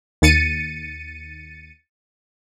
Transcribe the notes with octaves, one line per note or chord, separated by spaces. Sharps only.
D#2 A6 C#7 D#7